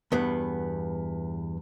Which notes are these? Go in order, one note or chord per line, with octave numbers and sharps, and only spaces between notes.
E2 G2 B3